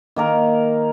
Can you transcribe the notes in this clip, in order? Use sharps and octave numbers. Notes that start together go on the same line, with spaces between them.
D#3 A#3 A#4